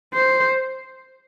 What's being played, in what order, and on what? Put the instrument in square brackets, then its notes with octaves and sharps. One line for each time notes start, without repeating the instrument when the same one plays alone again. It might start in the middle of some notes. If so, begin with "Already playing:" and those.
[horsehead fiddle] C5